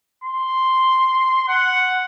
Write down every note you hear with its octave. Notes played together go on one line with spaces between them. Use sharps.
C6
F#5